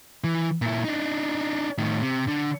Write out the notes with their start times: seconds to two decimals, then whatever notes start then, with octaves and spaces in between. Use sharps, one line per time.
0.24 E3
0.62 A#2 E4
0.84 D4 D#4
1.78 A2 D#3
2.03 C3
2.28 D3